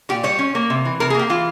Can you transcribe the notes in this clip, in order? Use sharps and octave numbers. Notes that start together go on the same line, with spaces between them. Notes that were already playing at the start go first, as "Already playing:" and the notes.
A#2 G4
G3 C#5
C#4
A#3
C3
E3
C3 A#4
G#4
A#3 G4
E3 F4